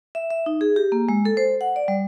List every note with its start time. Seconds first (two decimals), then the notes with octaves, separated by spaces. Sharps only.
0.15 E5
0.30 E5
0.46 D#4
0.61 G#4
0.76 G4
0.92 A#3
1.09 G#3
1.25 A4
1.37 C5
1.61 F#5
1.76 D5
1.88 G3